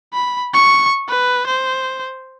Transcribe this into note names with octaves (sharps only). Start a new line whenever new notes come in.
B5
C#6
B4
C5